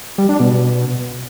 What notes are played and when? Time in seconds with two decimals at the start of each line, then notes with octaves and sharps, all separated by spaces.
0.18 G3
0.29 D4
0.40 B2